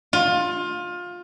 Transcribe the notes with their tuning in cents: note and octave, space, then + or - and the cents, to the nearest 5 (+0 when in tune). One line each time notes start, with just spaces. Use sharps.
F4 +20